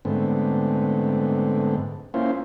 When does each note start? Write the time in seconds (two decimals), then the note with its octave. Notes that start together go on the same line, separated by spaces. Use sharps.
0.05 G#2 D3 A3 B3 C4
2.14 A#3 C#4 E4 F4 C5